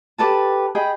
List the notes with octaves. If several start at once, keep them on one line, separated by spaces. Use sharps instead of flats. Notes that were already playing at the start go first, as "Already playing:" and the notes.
G4 A4 B4 A5
G#4 D#5 G5 B5